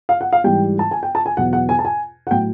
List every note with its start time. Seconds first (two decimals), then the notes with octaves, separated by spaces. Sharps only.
0.09 F5
0.21 F#5
0.33 F5
0.44 G#2 E3 G3 G5
0.79 A5
0.91 G#5
1.03 G5
1.15 A5
1.26 G#5
1.37 E2 B2 F#3 F#5
1.53 F#5
1.69 G#5
1.79 A5
1.85 G#5
2.27 F#5
2.31 A2 F#3 G5